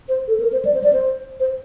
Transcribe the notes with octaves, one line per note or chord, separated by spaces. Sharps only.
C5
A4
A#4
C5
D5
C5
D5
C5
C5